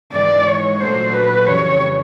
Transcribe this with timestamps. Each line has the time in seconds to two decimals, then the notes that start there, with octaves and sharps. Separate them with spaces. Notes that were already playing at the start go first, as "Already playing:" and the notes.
0.12 G#2 E3 G#3 D5
0.46 C#5
0.80 A#2 F#3 A3 D4 F#4 C5
1.13 B4
1.46 F2 C#3 E3 G3 C#5